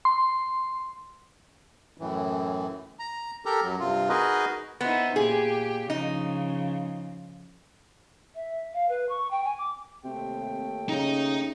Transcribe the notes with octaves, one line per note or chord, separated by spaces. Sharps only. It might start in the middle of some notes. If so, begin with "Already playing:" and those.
C6
F#2 A2 E3
A#5
G4 A4 A#4 A#5
F#2 F#3
G2 C3 F4
D#4 F#4 G#4 A#4 B4 D#5
B3 D#4 E4 C5
A#2 G4 G#4
C#3 F3 D#4
E5
F5
B4
C#6
G5
G#5
D6
D#2 C3 A3 G5
C#3 D#4